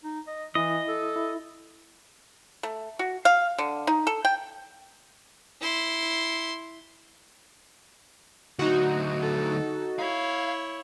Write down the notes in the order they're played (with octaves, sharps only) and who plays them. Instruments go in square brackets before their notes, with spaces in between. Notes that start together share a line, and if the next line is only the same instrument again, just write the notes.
[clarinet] D#4
D#5
[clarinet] E3 [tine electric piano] E4 [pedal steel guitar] D#5
[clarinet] A4
[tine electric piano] E4
[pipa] A3
F#4
F5
D3
D#4
A4
G5
[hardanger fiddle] E4 C6
[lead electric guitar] D2 F#3 [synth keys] D#4 F#4
[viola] A4
[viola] E4 C#5 [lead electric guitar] F5